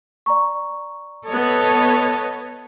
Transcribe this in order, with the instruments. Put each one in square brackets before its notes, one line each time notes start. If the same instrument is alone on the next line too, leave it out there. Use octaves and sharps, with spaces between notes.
[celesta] D5 A#5 C#6
[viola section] B3 C#5 [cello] A4 D#5